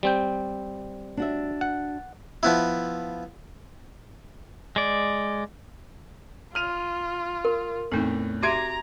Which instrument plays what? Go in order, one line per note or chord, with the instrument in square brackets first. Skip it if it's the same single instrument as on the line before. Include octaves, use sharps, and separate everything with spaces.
[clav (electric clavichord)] G3 C4 G5
[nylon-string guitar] D4 F#4 E5
[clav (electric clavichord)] F#5
[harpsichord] F3 B3 E4
[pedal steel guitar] G#3 D5
[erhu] F4 [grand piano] F6 D#7 F7
[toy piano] A#4
[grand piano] E2 A2 [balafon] C4 D#4 A4
[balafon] F#4 G4 E5 [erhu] A#5 [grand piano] C6 G#6 D7